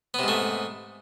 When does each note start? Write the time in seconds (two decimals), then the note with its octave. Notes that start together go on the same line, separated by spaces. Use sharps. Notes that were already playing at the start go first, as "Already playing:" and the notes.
0.14 B3
0.19 C3
0.23 G#2
0.28 A3